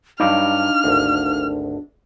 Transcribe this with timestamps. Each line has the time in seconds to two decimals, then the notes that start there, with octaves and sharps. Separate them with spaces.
0.20 G2 F#3 G3 D4 D#4 F5 D6 F6
0.84 G#1 D2